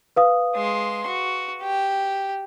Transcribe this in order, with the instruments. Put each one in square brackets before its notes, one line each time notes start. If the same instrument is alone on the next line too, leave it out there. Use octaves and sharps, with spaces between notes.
[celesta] B4 F5 D#6
[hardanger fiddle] G#3 C6
F#4
G4